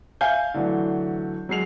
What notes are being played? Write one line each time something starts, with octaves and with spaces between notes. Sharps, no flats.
E5 F5 G#5 G6
D3 E3 F#3 A3
F#3 G#3 C7 F7